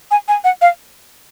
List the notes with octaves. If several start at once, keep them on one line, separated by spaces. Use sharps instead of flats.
G#5
G#5
F#5
F5